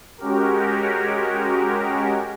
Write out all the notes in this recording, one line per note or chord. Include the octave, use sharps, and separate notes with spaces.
G#3 C#4 F#4 G4 A#4